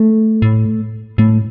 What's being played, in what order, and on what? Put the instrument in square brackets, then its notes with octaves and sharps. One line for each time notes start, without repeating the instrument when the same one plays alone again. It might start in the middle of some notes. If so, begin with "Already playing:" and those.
Already playing: [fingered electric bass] A3
[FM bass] A2
[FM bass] A2 [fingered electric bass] A3